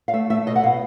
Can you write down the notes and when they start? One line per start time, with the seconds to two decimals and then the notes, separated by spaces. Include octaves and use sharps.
0.08 F5
0.13 A3 E5
0.30 A3 E5
0.46 B2 D#5
0.56 F#5
0.63 B2 F5